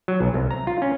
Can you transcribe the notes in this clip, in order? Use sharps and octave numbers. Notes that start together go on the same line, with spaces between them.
F#3
B1
C2
A#5
F4
C#4